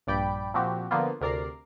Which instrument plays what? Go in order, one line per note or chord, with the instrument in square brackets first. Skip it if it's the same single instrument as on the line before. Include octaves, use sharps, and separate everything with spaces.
[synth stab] A#1 G2 D5 G5 B5 D7
A#2 F3 C4 F#4 G4
D3 F3 A#3 B3 F4
D2 C3 A#4 D5 A#5 C7